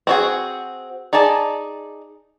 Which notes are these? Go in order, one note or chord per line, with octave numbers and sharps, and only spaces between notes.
C4 F#4 G#4
D#4 G#4 D5 A5